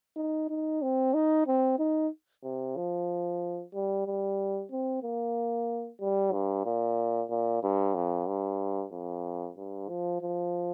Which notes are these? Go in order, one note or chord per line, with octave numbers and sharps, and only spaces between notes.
D#4
D#4
C4
D#4
C4
D#4
C3
F3
G3
G3
C4
A#3
G3
G2
A#2
A#2
G2
F2
G2
F2
G2
F3
F3